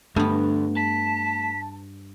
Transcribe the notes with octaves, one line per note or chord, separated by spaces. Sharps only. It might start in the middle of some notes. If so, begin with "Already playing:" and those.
D2 G2 A3 B3
A5 B6